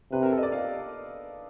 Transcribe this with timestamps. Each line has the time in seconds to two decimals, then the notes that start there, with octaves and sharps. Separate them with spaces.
0.12 C3 B4
0.22 A#4
0.32 A4
0.38 D#5
0.43 D5
0.52 F5